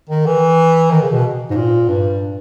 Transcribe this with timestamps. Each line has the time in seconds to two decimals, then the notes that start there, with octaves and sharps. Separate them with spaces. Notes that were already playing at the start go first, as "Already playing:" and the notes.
0.09 D#3
0.26 E3
0.91 D#3
1.02 C#3
1.13 B2
1.51 G#2
1.56 A#2
1.88 G2